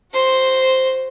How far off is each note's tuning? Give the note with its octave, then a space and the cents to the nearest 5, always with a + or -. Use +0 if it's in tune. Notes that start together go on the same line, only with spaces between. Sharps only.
F#4 +10 C5 +0